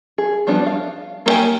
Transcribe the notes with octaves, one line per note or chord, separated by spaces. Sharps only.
G#4
F3 G3 B3 D4 F#4
F5
A#3 B3 G4 G5 G#5